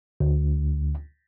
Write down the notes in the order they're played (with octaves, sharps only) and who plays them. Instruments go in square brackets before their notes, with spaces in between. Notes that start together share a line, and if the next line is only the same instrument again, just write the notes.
[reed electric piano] D2